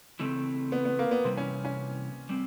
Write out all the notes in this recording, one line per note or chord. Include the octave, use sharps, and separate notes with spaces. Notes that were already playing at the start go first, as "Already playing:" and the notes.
C#3 E3 A3 C4
B3
B3
A#3
B3
C3 E3 G3 C4
C#4
C#4
G3 C4